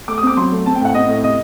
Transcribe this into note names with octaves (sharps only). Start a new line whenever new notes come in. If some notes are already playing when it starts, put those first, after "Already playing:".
A3 D6
D#6
C4 D6
F#3 C6
A3
C4 A5
G5
A2
F#5
C4 D#5
A2
C3 D#5